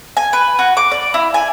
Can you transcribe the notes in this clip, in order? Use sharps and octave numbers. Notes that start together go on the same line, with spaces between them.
G#5
B4
F#4
D6
D5
E4
G#5